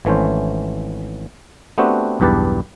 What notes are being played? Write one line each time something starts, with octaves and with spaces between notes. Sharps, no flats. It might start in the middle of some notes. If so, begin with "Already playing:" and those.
G#1 E3 A3 C#4 C5
A3 B3 C4 D4 F#4 G4
B1 E2 G2 G4 B4 A5